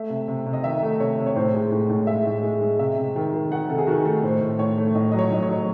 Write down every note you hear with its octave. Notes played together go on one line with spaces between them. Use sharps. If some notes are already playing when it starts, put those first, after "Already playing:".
Already playing: A3 E5
C3
C3
C3
D#5
D#3 E5
A3
C3 C#5
C3
C#5
A2 C5
G#3
A2
A2
G#3 E5
A2
G#3
G#3
C3 E5
C3
D#3
D#3
D#3 F#5
C3 A4
G#4
D#3 F#4
A3 A4
A2 C5
A2
A2 C#5
A3
A2 D#5
F#3 D#5
C#5
A2 D#5
C#5
F#3